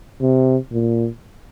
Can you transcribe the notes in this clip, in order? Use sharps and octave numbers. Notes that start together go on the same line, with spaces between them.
C3
A#2